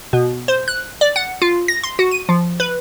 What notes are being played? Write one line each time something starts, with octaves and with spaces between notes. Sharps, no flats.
B2
C5
F#6
D5
F#5
F4
A#6
C6
F#4
D#7
F3
B4